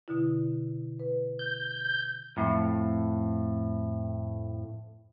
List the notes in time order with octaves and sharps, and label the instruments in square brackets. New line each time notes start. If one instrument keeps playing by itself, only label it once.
[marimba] B2 D3 E4
B4
[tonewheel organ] G6
[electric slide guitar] F2 A2